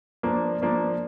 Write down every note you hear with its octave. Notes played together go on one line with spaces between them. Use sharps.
F3 A#3 D4
F3 A#3 D4